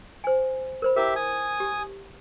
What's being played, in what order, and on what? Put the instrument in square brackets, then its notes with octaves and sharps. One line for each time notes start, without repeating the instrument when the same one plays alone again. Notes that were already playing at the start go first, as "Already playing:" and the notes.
[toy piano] C5 G#5
A#4 C5 B5
[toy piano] E4 A#4 [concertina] G4 E5
[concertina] G#5 D#6
[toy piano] G4